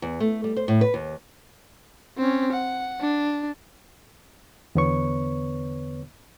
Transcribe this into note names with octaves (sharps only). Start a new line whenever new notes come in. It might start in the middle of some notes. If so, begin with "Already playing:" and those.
E2
A3
G3
C5
A2
B4
D#2
C4 C#4
F#5
D4
E2 D3 B3 B4 C#5 C#6